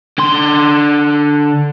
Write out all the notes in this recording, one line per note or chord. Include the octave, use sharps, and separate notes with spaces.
D3 C6